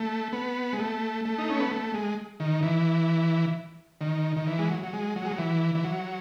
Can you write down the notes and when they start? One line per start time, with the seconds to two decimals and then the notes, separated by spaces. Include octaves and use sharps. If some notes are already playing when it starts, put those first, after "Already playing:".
Already playing: A3
0.33 B3
0.73 G#3
0.79 A3
1.25 A3
1.38 D#4
1.50 C#4
1.60 B3
1.71 A3
1.94 G#3
2.40 D#3
2.63 E3
4.01 D#3
4.37 D#3
4.47 E3
4.59 G#3
4.70 F#3
4.83 F#3
4.93 G#3
5.16 F#3
5.25 G#3
5.31 F#3
5.38 E3
5.75 E3
5.84 F#3